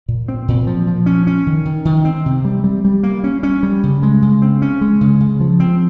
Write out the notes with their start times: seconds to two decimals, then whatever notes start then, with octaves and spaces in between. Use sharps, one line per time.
0.08 A#2
0.28 C4
0.48 A#2
0.67 F3
0.87 F3
1.06 C#4
1.27 C#4
1.47 D#3
1.65 D#3
1.85 D#3
2.05 C4
2.26 C3
2.45 G3
2.64 G3
2.85 G3
3.03 A#3
3.24 C#4
3.43 C#4
3.63 G3
3.83 C#3
4.03 G#3
4.22 C#3
4.42 C4
4.62 C#4
4.81 G#3
5.01 C#3
5.21 C#3
5.40 F3
5.60 C4